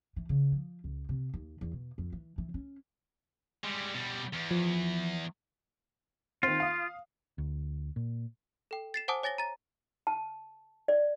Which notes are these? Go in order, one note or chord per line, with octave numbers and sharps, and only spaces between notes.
E3
C#3
F3
C#2
C3
D#2
E2
B2
F2
E3
E3
C#4
G3 G#3
B2 G3
E2
F3
D#3 C4 F4
F5 D#6
D2
A#2
A4 G5
A6 C7 E7
C5 F#5 G#5 A5 D6 D#6
C#5 G#5 A6 A#6 G7
A#5 A6
A5
D5